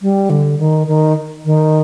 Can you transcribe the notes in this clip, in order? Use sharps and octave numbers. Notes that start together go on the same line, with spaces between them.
G3
D3
D#3
D#3
D#3